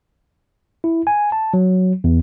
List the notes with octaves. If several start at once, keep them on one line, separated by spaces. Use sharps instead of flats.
E4
G#5
A5
F#3
E2